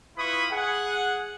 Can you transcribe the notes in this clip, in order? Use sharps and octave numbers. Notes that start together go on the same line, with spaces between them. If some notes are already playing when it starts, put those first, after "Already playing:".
E4 F4 B4 B5 C#6 D#6
G#4 F#5